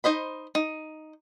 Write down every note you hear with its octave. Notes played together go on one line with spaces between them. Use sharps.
D#4 C5 D#5 B5
D#4